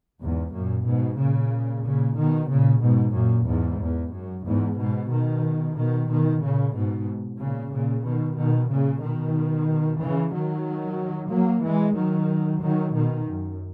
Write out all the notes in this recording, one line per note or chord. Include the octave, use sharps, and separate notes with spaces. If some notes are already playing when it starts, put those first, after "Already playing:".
E2 G#2
F#2 A#2
G#2 B2
A#2 C#3
A#2 C#3
B2 D#3
A#2 C#3
G#2 B2
F#2 A#2
E2 G#2
E2
F#2
E2 G#2
G#2 B2
B2 D#3
B2 D#3
B2 D#3
A#2 C#3
G#2 B2
A#2 C#3
A#2 C#3
B2 D#3
B2 D#3
A#2 C#3
B2 D#3
C#3 E3
D#3 F#3
F#3 A#3
E3 G#3
D#3 F#3
D#3 F#3
B2 D#3
F#2